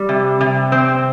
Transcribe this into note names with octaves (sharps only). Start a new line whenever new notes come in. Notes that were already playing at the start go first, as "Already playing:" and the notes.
Already playing: G3
C3
C3
C4